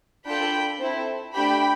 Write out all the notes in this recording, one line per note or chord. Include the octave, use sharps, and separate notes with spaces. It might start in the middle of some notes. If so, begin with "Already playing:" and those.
D4 F4 A4 G5 B5
C4 E4 A4
A3 D4 G4 G5 B5